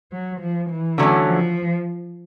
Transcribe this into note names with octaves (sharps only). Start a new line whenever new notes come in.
F#3
F3
E3
D3 F#3 A3 C#4
F3